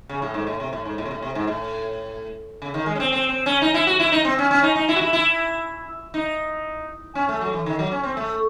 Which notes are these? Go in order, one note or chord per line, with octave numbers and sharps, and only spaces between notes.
C#3
A2
G#2
A2
C3
A2
G#2
A2
C3
A2
C3
G#2
A2
C#3
D#3
G#3
C#4
C4
C4
C4
C#4
D#4
E4
F#4
E4
D#4
C4
C#4
C#4
D#4
D#4
E4
F#4
E4
E4
D#4
C#4
A3
F#3
E3
D#3
F#3
C#4
C4
A3